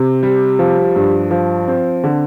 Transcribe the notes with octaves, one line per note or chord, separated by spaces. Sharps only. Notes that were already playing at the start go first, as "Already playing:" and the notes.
Already playing: C3
G3
F3
G2
F3
C4
D3